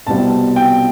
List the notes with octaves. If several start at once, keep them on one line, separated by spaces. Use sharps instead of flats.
C2 B2 G3 C4 E4 A5
G5